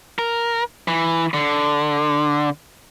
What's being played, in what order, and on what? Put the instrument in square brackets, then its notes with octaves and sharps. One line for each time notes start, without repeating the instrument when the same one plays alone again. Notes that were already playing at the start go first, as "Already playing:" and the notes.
[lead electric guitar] A#4
E3
D3